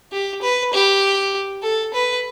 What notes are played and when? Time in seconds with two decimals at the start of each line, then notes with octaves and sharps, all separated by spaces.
0.12 G4
0.42 B4
0.73 G4
1.63 A4
1.93 B4